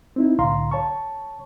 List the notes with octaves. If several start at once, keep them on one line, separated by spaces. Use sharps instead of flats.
C4 D#4 E4
C2 A2 D3 F5 A#5 C6
C#5 A5 C#6